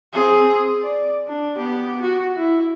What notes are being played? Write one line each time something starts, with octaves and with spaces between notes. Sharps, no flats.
C4 G#4
D5
D4
B3 G4
F#4
E4